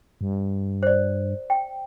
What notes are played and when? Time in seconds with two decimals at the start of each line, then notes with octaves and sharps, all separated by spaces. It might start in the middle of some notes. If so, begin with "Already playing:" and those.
0.21 G2
0.83 C5 D5
1.50 G5